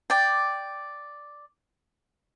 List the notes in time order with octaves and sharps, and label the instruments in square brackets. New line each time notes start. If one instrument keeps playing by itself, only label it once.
[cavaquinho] D5 G5